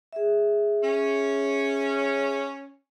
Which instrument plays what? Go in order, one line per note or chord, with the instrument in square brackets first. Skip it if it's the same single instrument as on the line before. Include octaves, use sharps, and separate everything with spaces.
[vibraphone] G#4 E5
[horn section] C#4